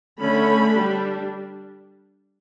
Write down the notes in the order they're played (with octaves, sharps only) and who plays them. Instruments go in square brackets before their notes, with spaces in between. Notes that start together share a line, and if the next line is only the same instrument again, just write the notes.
[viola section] D3 A3 C#4 B5
G3 D4